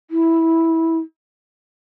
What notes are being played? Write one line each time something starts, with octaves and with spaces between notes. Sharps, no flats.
E4